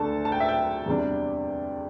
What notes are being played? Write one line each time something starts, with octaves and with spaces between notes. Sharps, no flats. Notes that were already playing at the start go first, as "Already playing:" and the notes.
Already playing: D2 D3 A3 D4 A4 A5
A5
G5
E5
G5
E2 C3 G3 D4